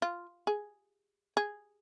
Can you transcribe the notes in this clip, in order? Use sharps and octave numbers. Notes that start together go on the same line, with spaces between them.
F4
G#4
G#4